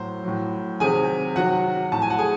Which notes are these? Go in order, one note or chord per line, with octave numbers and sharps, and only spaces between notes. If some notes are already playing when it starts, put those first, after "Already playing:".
Already playing: A2 F#3 C5
A2 F#3
C3 D#3 F#3 G#4 G#5
C3 D#3 F#3 F#4 F#5
A2 F#3 A5
G#5
F#5
G#4 G#5